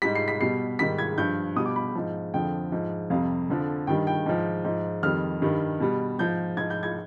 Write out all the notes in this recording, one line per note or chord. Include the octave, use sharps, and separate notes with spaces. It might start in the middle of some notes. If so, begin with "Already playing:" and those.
G#2 G3 B6
C7
B6
B2 G3 C7
G#2 D#3 G3 B6
G#6
G2 F3 G6
B2 G3 D#6
D6
B5
G#2 F3
F2 D3 F3 G5
G#2 F3
F2 C3 G3 F5
F2 D3 F3
G2 D#3 G3 G5
G5
G#2 F3
G#2 F3
F2 D#3 G3 F6
G2 D#3 G3
B2 G3
G#2 F3 G6
G#2 F3 G#6
G6
G#6